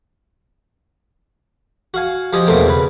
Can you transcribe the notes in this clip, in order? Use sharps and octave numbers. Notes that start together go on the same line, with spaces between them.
F#4 F5 G#5
F3 G4 D#5 G#5
E2 B2 A3 A#3 C4 G5
C#3 B4